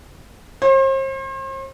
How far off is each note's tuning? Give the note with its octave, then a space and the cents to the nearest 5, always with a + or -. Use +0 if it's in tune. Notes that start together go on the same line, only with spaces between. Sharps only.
C5 +40